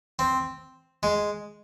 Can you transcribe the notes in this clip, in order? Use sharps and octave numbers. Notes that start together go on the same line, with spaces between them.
C4
G#3